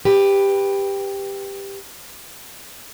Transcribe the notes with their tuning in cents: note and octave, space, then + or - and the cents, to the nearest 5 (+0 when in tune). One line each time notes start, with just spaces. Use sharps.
G4 +10 B4 +0